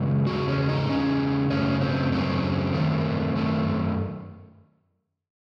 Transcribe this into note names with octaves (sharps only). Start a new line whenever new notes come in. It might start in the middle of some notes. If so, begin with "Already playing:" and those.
Already playing: F#2 C#3 G#3
E2 C#3 G#3 F#4
C#4
D#4
E2 C#3 G#3 C#4
F#2 C#3 F#3 A3 C#4
C4
F#2 C#3 F#3 A3 C4
F#2 D#3 A3
F#2 D#3 A3